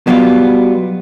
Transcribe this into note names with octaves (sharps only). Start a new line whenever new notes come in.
B2 F#3 G3 B3 F4